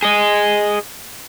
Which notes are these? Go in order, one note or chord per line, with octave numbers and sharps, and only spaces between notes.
G#4 D#5